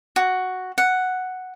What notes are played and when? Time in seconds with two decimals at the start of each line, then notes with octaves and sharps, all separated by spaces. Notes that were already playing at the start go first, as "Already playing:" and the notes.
0.16 F#4
0.78 F#5